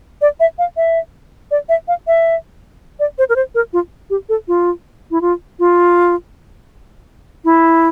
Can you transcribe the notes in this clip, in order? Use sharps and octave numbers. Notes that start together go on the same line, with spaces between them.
D5
E5
F5
E5
D5
E5
F5
E5
D5
C5
A#4
C5
A#4
F4
G4
A4
F4
E4
F4
F4
E4